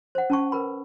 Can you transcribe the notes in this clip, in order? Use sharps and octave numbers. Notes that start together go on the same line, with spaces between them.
C5 F#5
C#4 A5 C#6
A#4 B4 B5